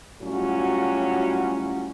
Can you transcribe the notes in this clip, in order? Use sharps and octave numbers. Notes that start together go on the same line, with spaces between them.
A2 F#3 G3 C#4 F4 F#4